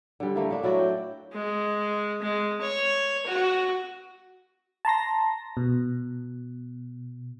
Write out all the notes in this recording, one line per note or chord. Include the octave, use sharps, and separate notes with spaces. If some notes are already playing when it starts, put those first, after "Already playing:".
D3 G3
A3 A#3 E4
A3 D4
F#3 E4 F#4 D5
G5
G#3
G#3
C#5
F#4
A5 A#5 C6 A#6
B2